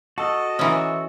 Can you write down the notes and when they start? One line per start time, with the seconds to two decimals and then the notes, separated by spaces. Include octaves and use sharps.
0.18 F#4 A4 D#5 A5
0.59 E3 C#4 A#4 C6 D#6